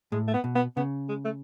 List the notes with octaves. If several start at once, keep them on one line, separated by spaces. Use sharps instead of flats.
A2 G#3
A3
B3
B2
B3
C#3 B3
G#3
A3